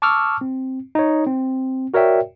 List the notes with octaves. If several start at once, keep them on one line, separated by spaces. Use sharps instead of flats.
A5 C#6 D6 E6 F6
C4
D#4 C#5
C4
F#4 A#4 C#5 D5 E5 G5